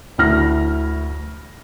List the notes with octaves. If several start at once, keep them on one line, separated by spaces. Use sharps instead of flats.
D2 E4 F6 A#6